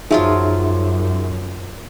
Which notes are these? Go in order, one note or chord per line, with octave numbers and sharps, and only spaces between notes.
F#2 F3 F#3 D#4 F4 G#4 E5